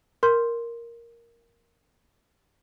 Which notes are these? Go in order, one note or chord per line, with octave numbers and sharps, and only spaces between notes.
A#4 C6 G6